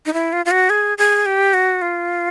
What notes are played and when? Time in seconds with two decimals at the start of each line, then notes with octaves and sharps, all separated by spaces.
0.06 D#4
0.13 E4
0.33 F4
0.46 F4
0.51 F#4
0.70 G#4
0.98 G#4
1.26 G4
1.54 F#4
1.82 F4